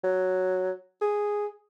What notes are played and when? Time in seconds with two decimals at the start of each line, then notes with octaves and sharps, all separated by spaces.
0.04 F#3
1.01 G#4